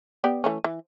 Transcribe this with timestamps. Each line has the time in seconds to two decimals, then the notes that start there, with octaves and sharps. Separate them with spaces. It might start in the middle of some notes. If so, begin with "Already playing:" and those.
0.24 B3 G4 D5
0.44 E3 A3 C#4
0.64 E3